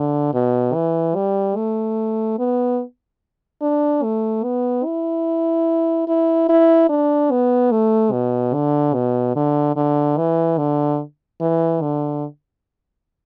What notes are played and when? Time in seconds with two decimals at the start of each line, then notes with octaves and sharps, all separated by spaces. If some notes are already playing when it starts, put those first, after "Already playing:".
Already playing: D3
0.34 B2
0.74 E3
1.15 G3
1.56 A3
2.39 B3
3.61 D4
4.03 A3
4.44 B3
4.85 E4
6.08 E4
6.49 E4
6.89 D4
7.31 B3
7.71 A3
8.12 B2
8.54 D3
8.94 B2
9.36 D3
9.76 D3
10.17 E3
10.58 D3
11.41 E3
11.82 D3